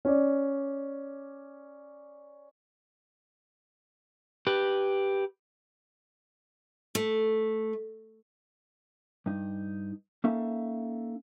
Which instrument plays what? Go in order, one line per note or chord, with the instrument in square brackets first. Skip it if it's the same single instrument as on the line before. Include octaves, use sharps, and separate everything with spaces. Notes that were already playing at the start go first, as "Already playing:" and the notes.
[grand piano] C#4 D5
[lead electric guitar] G4 B4
[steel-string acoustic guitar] A3
[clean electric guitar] G2 D#4
A#3 C#4 D#4 A4 E5 F5